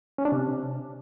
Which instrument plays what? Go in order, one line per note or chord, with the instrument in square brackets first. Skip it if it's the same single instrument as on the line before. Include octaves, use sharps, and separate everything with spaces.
[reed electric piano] C#4
D4
C3